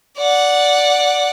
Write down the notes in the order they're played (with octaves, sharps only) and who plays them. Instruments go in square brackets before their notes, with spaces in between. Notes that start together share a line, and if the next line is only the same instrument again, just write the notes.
[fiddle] D5 F#5